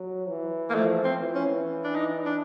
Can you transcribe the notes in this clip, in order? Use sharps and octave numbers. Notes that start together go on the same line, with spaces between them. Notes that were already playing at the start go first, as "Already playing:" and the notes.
Already playing: F#3
E3
A#3
F3 A3
C4
E3
C#4
D4
D#4
D4